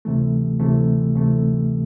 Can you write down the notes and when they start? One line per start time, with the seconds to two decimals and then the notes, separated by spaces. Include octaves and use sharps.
0.05 D2 C3 E3 A3
0.59 D2 C3 E3 A3
1.15 D2 C3 E3 A3